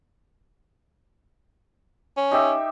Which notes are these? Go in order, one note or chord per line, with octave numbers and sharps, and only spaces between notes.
C#4
D#4 G4 E5